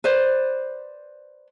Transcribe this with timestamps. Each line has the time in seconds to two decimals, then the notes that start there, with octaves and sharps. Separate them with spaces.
0.04 B4 C5 D5